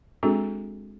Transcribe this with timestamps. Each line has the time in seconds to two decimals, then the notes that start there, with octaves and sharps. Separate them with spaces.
0.23 G#3 C4 D4 F#4 G#4 A4